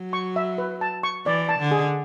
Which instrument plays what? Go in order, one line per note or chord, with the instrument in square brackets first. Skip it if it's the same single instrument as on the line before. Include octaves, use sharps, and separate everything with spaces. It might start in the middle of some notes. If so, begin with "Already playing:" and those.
Already playing: [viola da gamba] F#3
[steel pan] C#6
E5
B4
A5
C#6
[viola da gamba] E3 [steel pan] D5
[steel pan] A5
[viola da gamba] D3
[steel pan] G#4